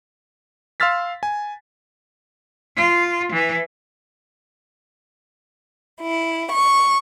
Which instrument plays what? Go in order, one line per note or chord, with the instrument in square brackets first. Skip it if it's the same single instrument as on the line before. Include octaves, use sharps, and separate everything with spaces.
[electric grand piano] F5 C6 E6 F6 A6 B6
G#5
[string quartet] F4
E3
E4
C#6